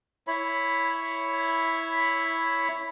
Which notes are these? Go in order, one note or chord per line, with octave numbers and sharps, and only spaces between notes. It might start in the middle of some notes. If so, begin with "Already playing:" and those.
E4 C#5 B5